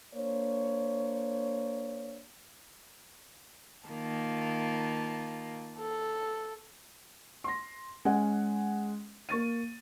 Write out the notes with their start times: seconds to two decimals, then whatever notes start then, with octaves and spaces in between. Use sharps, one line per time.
0.14 A#3 D4 C5 C#5
3.89 D#3 A#3 F4 A5
5.78 A4
7.44 C6 A#6
8.05 G#3 C#4 F#5 G#5
9.29 A#3 C#6 A6 D#7